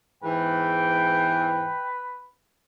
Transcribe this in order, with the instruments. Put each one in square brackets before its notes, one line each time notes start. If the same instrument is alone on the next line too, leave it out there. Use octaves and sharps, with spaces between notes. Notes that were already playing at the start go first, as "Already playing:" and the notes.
[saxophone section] E2 G#2 E3 [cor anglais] B4 [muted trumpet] G5